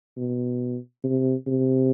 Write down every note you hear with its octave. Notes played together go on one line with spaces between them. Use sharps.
B2
C3
C3